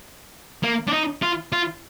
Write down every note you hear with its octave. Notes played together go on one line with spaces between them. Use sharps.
A#3
D4
D#4
F4
F4